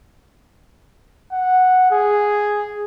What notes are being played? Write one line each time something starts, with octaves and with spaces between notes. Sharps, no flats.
F#5
G#4